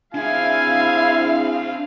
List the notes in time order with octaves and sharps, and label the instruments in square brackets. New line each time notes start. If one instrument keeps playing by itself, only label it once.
[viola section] C4 G#4 F5 [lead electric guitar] D4 E5 [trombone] E4 [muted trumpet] G#5